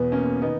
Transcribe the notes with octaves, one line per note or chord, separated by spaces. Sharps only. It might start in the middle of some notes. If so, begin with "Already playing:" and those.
Already playing: E2 B2 B3
A#3 C#4
D#3 B3 D#4